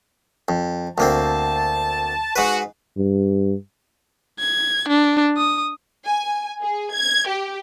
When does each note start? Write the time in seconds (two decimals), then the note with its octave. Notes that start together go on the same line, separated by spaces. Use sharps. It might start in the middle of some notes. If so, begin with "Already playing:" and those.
0.48 F2
0.98 D2 A#3 C4 A5
2.36 G#2 F#4 B4
2.97 G2
4.39 G#6
4.88 D4
5.37 D#6
6.05 G#5
6.62 G#4
6.93 G#6
7.27 G4